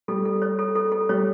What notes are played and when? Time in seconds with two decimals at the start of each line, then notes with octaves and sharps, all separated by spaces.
0.08 G3 A4
0.25 A4
0.42 C#5
0.59 A4
0.75 A4
0.92 A4
1.09 G3 C#5